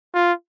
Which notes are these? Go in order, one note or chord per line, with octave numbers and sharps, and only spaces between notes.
F4